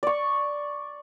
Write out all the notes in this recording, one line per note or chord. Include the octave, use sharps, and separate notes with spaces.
D5 C#6